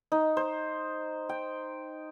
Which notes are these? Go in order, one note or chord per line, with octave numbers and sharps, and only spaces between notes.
D#4
C5
G5